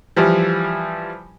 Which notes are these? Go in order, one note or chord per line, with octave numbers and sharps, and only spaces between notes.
E3 F3 G3